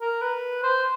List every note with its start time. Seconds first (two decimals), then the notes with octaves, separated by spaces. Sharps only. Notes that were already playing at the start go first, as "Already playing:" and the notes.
0.01 A#4
0.22 B4
0.63 C5